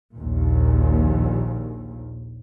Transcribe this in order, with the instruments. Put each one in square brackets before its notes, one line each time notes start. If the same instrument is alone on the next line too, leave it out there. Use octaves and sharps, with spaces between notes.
[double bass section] A#1 D#2 A#2